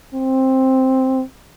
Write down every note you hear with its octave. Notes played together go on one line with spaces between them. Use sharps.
C4